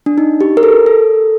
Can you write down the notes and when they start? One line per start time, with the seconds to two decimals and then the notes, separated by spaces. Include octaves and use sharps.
0.06 D4
0.18 D#4
0.41 G4
0.57 A#4
0.63 A4
0.86 A4